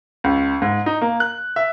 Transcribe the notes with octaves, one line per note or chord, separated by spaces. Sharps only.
C#2
G#2
D#4
A#3
F#6
E5